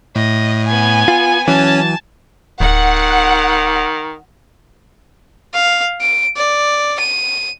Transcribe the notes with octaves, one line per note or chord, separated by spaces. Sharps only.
A2 D#5
B3 G#5
F4
E3 F#3 C#4 G#5 A5
D1 D#3 F#5
F5
D7
D5
D#7